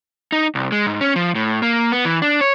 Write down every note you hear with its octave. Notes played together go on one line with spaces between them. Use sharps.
D#4
C2
G#3
G#2
C#4
F3
A2
A#3
B3
E3
D4
C#5